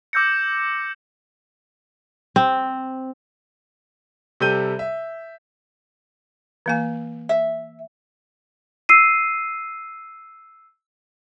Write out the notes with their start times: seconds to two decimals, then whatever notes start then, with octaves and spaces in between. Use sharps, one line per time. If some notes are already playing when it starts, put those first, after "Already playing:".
0.13 D6 E6 G6 A#6 C#7
2.36 C4
4.40 C3 G3 A4 G6 D#7 G7
4.79 E5
6.66 E3 A#3 G#5
7.29 E5
8.89 E6 C7 D#7